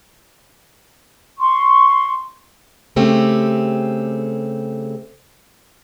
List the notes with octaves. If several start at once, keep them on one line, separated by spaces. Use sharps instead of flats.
C6 C#6
C#3 A3 C4 G4